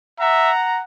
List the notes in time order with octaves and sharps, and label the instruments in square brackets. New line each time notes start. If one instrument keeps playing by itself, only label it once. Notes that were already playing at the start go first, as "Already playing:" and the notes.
[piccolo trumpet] E5 [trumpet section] F#5 A#5